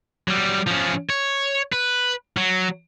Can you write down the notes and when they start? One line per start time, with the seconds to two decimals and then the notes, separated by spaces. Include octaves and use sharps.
0.28 F#3 G3
0.67 F3 C#4
1.10 C#5
1.72 B4
2.37 F#3